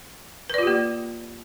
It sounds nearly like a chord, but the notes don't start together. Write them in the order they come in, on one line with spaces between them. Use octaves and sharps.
B4 D5 F4 G4 A#3